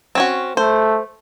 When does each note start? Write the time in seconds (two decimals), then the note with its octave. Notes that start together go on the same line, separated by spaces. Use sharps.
0.15 C4 C#4 F#4
0.57 A3 C5